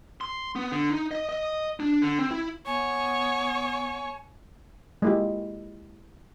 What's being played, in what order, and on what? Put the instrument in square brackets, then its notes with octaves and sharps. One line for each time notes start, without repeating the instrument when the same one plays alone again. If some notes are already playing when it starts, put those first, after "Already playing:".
[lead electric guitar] C6
B3
D3
D#4
D#5
D#5
D4
D3
C4
E4
[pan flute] B3 [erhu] C#5 [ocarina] G#5
[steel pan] G#3 A#3 E4 F4 G4